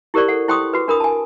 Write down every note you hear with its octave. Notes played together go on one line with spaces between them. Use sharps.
E4 G4 A#4 C5 D5 C#6
A4 F#5
E4 C5 G5 C6 C#6 D#6
F#4 B4
D4 A#4 B5 D#6
G#5 A5